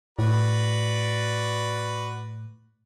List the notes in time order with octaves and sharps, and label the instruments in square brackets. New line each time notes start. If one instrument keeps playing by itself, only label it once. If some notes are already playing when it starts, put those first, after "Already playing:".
[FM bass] A2 [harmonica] F#4 B4 D5